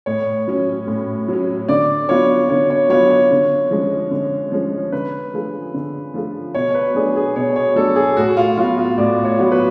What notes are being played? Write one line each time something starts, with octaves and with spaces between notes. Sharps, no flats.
A2 C#5
F#3 C#4
A2
F#3 C#4
D3 D5
F#3 B3 F4 C#5
D3 C#5
C#5
F#3 B3 F4 C#5
C#5
D3
F3 G#3 C#4
D3
F3 G#3 C#4
D3 B4
F3 A3 F4 G#4
D3
F3 A3 F4 G#4
B2 C#5
B4
F#3 A3 D4 G#4
G#4
B2 C#5
C#5
F#3 A3 D4 A4
G#4
A2 F#4
F4
F#3 B3 F4 F#4
F4
A2 D5
C#5
F#3 B3 F#4
B4